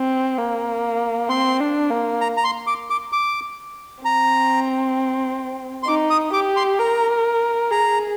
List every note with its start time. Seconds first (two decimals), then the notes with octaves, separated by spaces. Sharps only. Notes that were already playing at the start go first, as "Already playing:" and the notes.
Already playing: C4
0.37 A#3
1.29 C4 C6
1.60 D4
1.90 A#3
2.21 A#5
2.37 A#5
2.44 C6
2.67 D6
2.90 D6
3.12 D6
4.04 C4 A#5
5.83 C6
5.87 D#4 D6
6.10 D#6
6.33 G4 D6
6.56 C6
6.79 A#4 A#5
7.71 G#4 A#5